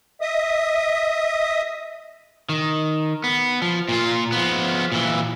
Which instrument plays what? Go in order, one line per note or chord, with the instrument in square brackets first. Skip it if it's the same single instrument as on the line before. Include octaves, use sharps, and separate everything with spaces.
[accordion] D#5 E5 D#6
[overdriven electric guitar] D#3
B3
F3
A#2 F4
F3 B3
A#2 E3